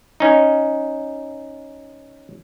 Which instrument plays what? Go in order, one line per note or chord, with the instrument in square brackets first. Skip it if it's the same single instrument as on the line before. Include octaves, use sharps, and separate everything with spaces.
[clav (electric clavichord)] C#4 D#4